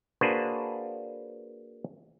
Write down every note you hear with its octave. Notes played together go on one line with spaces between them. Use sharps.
A#3 D4 F#4 G#4 B4 C5